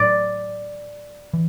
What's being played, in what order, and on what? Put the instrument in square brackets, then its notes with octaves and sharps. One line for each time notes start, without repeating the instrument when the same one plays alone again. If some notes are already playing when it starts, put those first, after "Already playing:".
Already playing: [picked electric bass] A2 F#3 [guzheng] D5
[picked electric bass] E3